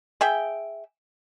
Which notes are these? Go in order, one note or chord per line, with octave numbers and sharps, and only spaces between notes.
G#4 E5 G5